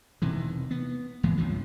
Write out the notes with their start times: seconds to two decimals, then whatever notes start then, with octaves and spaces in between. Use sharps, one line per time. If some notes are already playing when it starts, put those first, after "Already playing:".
0.22 E1 C3 D#3 E3
0.71 B3
1.23 G#1 E3 G#3 B3
1.37 C#2 G2 C3 F3